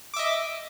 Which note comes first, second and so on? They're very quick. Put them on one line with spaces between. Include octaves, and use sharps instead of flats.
D6 E5 D#5